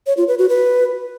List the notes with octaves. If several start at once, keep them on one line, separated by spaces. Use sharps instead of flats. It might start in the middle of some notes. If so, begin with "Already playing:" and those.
C#5
F4
B4
F#4
B4